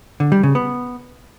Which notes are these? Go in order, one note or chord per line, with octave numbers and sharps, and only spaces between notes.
D3
G3
C#3
B3